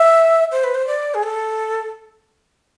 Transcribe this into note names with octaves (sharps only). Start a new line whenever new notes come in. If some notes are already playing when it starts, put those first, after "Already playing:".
Already playing: E5
C5
B4
C5
D5
G#4
A4